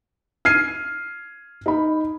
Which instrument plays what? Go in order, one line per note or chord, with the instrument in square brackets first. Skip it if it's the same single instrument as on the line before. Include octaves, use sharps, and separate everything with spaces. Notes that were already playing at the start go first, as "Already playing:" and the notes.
[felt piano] F6 G#6 C7 D#7
D#4 B5